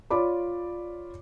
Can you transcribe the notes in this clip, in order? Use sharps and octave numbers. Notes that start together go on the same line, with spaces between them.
F4 C#5 D5 B5 D6